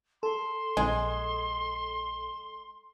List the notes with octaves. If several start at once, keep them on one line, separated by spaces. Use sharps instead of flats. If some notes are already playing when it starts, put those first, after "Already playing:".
A4 C6
A#1 G#3